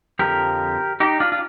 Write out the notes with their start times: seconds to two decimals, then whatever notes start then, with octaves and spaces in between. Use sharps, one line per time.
0.19 F2 D3 F3 G4 A#4
1.00 D#4 G4
1.20 D4 F4
1.32 F4